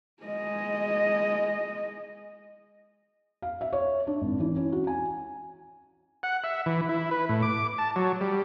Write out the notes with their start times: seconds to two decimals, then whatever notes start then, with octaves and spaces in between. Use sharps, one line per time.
0.23 G#3 D#5
3.42 F5
3.61 E5
3.73 C#5
4.07 D4
4.21 G#1
4.40 E3
4.56 C#4
4.72 F#4
4.87 G#5
6.23 F#5
6.44 E5
6.66 E3
6.89 E4
7.11 B4
7.29 A2
7.42 D6
7.78 A5
7.96 F#3
8.21 G3